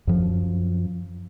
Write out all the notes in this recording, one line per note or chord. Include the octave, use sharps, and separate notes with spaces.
F#2 F3